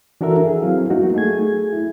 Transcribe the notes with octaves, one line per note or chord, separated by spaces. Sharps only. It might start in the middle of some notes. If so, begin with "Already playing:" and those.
E3 D4 F#4 A4 A#4 E5
G#4
F#3 C4 E4 F5
F#3 A#3 B3 D#4 F#4
A3 G#4 G#6
E4